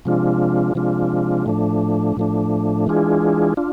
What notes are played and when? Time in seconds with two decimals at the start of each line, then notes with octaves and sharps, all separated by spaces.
0.05 C3 F3 G#3 D4 F4
0.75 C3 F3 G#3 D4 F4
1.46 A2 F3 A3 D4
2.17 A2 F3 A3 D4
2.87 E3 G#3 D4 F4 G#4
3.57 D4 F4